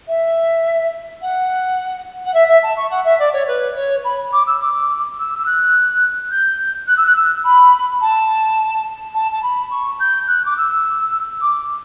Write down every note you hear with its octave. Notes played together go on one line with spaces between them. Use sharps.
E5
F#5
F#5
E5
E5
A5
C#6
F#5
E5
D5
C#5
B4
C#5
B5
D6
E6
D6
E6
E6
F#6
G6
F#6
E6
F#6
E6
B5
A5
A5
A5
B5
C#6
G6
F#6
D6
E6
D6